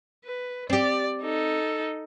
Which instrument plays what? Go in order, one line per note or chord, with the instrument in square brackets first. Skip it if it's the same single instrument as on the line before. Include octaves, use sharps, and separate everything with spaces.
[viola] B4
[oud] C4 G4 [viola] D5
[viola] D#4 A4